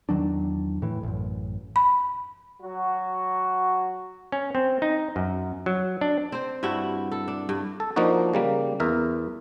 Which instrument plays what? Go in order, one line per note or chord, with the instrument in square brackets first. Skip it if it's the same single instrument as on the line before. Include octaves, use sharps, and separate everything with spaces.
[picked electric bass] E2 D#3 F#3 D4
A2 E3
A1 F#2
[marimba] B5
[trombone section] F#3 F#4
[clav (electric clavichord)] C#4
C4
D#4
F#2
F#3
D4
[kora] C4 C5
G2 G3 E4 F#4
A4
D4
G2
[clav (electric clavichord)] A4
F3 A#3 D4 D#4 F#4
C#3 G3 A#3
E2 A#4 E5